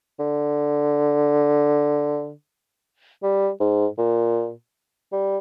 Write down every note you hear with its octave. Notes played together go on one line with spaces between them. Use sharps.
D3
G3
G#2
A#2
G3